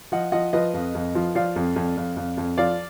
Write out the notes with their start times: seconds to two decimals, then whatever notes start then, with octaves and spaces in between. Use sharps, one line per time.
0.12 F3 D#5 F#5
0.32 F3 D#5 F#5
0.53 F3 B4 D#5
0.74 F2
0.95 F2
1.15 F3
1.35 F3 D5 F5
1.56 F2
1.76 F2
1.97 F2
2.17 F2
2.37 F2
2.58 F3 D5 F5